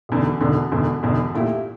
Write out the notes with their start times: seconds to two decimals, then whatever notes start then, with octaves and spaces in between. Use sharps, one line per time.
0.09 E1 E2 D3
0.41 E1 E2 D3
0.72 E1 E2 D3
1.03 E1 E2 D3
1.35 A#2 A3 E4 G4